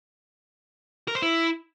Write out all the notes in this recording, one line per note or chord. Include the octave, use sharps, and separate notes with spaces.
A#4
C5
E4